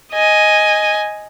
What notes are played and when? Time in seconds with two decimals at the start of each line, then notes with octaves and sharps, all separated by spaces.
0.12 D#5 G#5